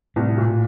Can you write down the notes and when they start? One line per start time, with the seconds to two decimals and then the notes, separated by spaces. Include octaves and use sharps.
0.16 C2 A2
0.38 A#2